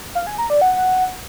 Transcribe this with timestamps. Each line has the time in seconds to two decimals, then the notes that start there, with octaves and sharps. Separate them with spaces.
0.15 F5
0.27 G#5
0.38 A#5
0.50 D5
0.62 F#5